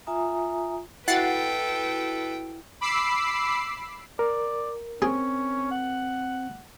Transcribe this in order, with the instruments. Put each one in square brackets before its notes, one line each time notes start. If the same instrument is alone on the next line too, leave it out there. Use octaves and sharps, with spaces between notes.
[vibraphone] F4 E5 G#5 A#5 D#6
[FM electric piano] E4 F#4 [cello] A4 B4 [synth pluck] F#5 A6 C7 [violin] G5
[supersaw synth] B5 D6 E6 C7
[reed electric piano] A#4 [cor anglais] D5
[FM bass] C4 [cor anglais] C#4 [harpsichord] G#4
[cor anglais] F#5